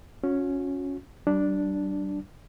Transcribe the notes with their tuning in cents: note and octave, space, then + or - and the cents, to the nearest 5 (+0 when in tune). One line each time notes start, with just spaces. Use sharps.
C#4 +0 F#4 -40
G3 -40 D4 +0